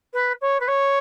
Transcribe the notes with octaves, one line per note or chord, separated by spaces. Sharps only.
B4
C#5
B4
C#5